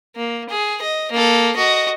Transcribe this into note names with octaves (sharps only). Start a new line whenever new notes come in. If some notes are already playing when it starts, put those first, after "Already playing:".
A#3
G#4
D#5
A#3 A4
F#4 D#5